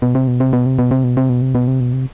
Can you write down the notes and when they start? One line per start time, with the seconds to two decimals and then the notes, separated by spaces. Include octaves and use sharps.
0.02 B2
0.15 C3
0.28 B2
0.40 C3
0.53 B2
0.66 C3
0.79 B2
0.91 C3
1.04 B2
1.17 C3
1.29 B2
1.42 C3
1.55 B2
1.68 C3
1.80 B2
1.93 C3